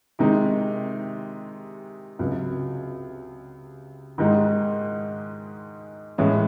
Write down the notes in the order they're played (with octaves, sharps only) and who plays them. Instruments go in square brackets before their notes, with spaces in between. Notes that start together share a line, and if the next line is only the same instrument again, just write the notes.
[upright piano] C3 D#3 G#3 D#4
C#2 C3 F#3
G#2 D#3 G#3 D#4
A2 E3 G#3 C#4